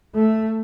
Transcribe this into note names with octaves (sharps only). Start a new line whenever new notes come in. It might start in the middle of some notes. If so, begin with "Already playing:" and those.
A3